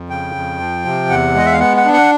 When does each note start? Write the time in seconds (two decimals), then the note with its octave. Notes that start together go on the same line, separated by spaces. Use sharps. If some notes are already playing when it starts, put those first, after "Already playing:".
Already playing: F2
0.10 C#3 G5
0.35 F2
0.60 F3
0.85 C3
1.10 E2 F#5
1.35 G#3 D#5
1.46 E5
1.52 F5
1.60 B3 F#5
1.77 F#5
1.85 D4
1.93 F#5